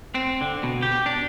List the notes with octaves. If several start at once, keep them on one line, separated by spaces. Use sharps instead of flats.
C4
D3
B2
G4
D4